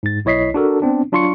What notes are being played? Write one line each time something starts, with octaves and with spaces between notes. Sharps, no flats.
G#2 A6
B1 E4 C#5 D#5 B6 C7
D4 F#4 A4 A#4
B3 C4 D4
F#3 D4 F4 C6 C#6 C#7